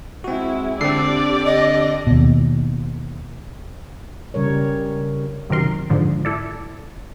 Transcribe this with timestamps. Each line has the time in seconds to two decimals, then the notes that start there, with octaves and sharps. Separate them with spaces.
0.24 G#3 C4 E4 F#4
0.81 D3 C4 G4 D5 C7
1.46 D#5
2.07 D#2 B2
4.34 C#3 G3 A#4 C#5
5.50 F#2 C3 D#3 A#4 C6
5.90 G#2 D3 F3
6.25 E4 A4 D5